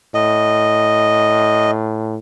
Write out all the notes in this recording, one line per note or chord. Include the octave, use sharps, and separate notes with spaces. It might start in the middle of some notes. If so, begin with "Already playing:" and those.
A2 D#5